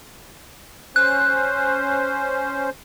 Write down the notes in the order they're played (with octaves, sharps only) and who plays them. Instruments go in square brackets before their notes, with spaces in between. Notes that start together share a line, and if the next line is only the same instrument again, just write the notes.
[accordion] C#4 C5 [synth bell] F#6